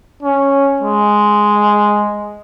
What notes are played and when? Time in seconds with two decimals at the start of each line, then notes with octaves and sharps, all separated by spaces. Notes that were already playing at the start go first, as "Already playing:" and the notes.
0.23 C#4
0.82 G#3